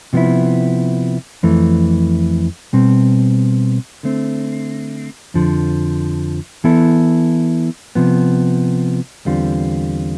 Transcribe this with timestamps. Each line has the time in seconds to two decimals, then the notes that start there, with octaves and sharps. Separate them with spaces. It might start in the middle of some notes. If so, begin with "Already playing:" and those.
0.13 C3 F3 B3 E4
1.43 F2 E3 A3
2.73 B2 G3 C4
4.03 D3 A3 C4
5.34 F2 D3 F3
6.64 E3 B3 E4 A4
7.95 C3 F3 B3
9.25 E2 D3 G3 C4 F4